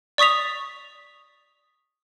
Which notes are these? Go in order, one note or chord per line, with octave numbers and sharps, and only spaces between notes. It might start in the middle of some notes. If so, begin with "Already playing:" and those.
D5 C#6 D#6 B6 F7